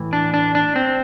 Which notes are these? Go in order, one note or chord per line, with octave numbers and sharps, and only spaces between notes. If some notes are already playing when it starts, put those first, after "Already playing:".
Already playing: A2 E3
D4
D4
D4
C4